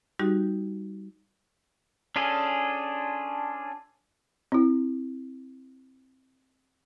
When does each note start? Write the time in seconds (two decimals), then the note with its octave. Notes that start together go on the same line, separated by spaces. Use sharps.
0.19 G3 D#4 F#4 G4
2.16 C#4 D4 F4 G#4 A4
4.52 C4 E4